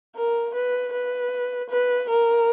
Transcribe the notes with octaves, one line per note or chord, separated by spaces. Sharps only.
A#4
B4
B4
B4
A#4